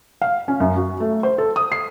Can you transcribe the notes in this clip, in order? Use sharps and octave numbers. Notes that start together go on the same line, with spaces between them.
F5
C#4
F#2
F#4
A3
C5
A4
D#6
C7